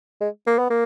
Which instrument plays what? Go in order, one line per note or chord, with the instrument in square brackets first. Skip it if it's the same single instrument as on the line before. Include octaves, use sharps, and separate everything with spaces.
[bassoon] G#3
A#3
B3
A#3